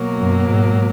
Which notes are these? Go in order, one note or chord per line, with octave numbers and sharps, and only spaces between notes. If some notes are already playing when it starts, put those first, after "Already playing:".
Already playing: B2 F#3 A#3
F#2
G#2